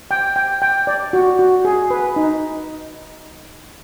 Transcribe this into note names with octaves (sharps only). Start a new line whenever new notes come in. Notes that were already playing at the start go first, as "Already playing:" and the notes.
G5
G5
G5
D5
F#4
F#4
G#4
B4
D#4